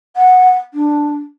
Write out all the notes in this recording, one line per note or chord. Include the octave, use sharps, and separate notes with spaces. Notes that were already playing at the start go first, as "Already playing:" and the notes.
F#5
D4